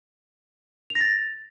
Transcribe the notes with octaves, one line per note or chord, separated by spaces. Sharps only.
F7
A#6
A6